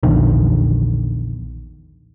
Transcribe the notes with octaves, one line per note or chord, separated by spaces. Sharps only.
A#1 E2 D3 D#3